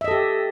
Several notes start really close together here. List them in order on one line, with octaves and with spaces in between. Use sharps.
E5 D#5 A4 G4